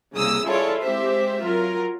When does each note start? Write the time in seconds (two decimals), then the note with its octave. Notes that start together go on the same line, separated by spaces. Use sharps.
0.15 C2 C#3 A#3 D#6 E6
0.47 E4 F4 G#4 A4 C#5 D5
0.82 G#3 C4 G4 C5 E5
1.42 F#3 F4 A#4